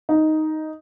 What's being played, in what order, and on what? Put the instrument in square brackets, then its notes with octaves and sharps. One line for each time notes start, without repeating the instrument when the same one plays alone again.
[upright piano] D#4